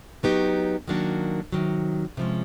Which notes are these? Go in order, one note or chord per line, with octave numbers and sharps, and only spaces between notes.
F#3 B3 D#4 G4
D#3 F#3 A#3 D4 F#4
C3 D#3 F#3
C3 F3 G#3 C#4